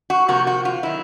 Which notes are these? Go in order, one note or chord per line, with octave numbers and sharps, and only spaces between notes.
F#4
C3 F3 A#3 F#4
F#4
F4
D#3 F#3 E4